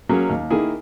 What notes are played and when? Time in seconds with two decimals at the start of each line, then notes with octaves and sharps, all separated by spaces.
0.09 F#3 A#3 C#4 G#4
0.30 D#2
0.50 D#3 A#3 E4 G#4